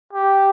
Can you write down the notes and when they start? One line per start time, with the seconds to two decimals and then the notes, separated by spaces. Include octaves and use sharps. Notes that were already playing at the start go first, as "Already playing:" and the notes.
0.14 G4